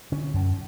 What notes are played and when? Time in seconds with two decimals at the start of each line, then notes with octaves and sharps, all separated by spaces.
0.12 D3 C#4
0.34 F#2